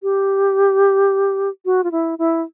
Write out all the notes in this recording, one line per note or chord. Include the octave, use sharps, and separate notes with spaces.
G4
F#4
F4
E4
E4